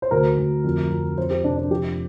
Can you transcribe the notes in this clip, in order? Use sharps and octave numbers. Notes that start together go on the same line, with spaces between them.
C5
D2 A#4
D2
F2
F2
F2 C5
G4
F1 D4
D4
F2 G4